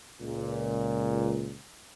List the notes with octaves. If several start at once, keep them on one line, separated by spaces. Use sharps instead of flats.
C#2 A#2